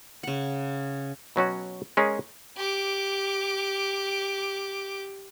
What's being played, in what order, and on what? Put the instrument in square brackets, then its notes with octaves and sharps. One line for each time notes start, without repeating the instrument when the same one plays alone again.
[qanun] C#3 F#5
[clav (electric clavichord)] B2 F#3 C#4 F#4
G#3 C#4 G#4 A#4
[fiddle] G4 D6